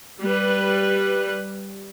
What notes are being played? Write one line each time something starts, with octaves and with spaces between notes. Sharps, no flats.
G3 B4